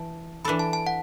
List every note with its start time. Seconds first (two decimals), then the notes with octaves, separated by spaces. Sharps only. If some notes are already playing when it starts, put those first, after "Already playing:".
Already playing: E3 A5
0.45 E3 D4 A4 B5
0.59 A5
0.73 A5
0.87 F#5